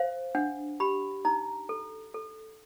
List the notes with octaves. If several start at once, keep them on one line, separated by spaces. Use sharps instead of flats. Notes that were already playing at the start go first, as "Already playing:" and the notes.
Already playing: C5 F5
D4 F#5
G4 B5
D#4 A#5
A4
A4